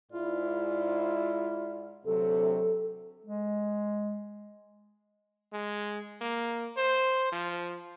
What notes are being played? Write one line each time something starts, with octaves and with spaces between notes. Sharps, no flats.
G#2 E4 F4 D5
D2 C3 F#3 A4
G#3
G#3
A#3
C5
F3